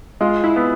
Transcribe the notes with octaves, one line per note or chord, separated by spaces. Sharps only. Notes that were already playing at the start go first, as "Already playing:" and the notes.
G#3 F4
E4
B3